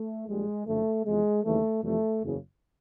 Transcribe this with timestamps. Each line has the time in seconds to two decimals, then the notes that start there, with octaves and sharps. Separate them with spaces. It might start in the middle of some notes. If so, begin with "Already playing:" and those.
Already playing: A3
0.28 A#1 A#2 G3 G#3
0.67 F#1 F#2 D3 F3 A3
1.05 E2 C3 F3 G#3
1.44 D#2 C#3 E3 G3 A3
1.83 F2 C3 E3 G3 A3
2.21 F#1 E2 C#3